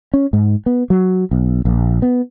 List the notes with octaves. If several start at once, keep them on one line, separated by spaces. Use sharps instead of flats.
C#4
G#2
B3
F#3
B1
A#1
B3